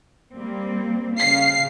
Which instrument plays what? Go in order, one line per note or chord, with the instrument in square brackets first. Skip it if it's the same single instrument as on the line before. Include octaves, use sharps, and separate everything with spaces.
[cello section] G3 A#3 C4
[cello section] C#3 F5 [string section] C7